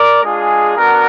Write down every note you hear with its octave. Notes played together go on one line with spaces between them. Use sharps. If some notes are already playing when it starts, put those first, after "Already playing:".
Already playing: A#4 D5
G#3 D4 F4 G#4
B3 D4 F#4 A#4